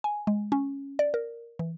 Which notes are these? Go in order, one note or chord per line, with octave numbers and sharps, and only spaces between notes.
G#5
G#3
C#4
D5
A#4
E3